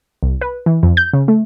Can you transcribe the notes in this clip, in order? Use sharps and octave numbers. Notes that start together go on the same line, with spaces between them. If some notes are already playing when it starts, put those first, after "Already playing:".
C2
B4
E3
F2
G6
C#3
A3